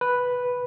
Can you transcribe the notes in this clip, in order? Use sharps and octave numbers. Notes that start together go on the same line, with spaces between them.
B4